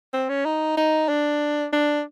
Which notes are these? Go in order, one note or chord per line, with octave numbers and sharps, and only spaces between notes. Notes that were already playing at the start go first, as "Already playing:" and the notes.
C4
C#4
D#4
D#4
D4
D4